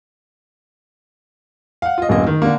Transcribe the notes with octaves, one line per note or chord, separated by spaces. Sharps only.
F5 F#5
F4 D#5
D1 F#2 F#3 A#3 D#5
D#3
D3 A#3